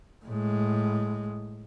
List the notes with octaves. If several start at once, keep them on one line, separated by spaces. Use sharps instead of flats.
A2 G#3